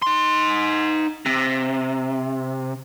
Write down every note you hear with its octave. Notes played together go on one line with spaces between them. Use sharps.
D#4 C6
C3